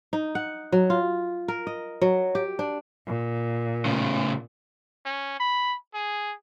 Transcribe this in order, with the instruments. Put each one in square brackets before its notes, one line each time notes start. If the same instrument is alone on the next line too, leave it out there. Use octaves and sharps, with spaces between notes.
[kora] D#4
F#5
F#3
F4
A#4
D#5
F#3
G4
D4
[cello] A#2
[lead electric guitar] A2 C#3
[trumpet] C#4
B5
G#4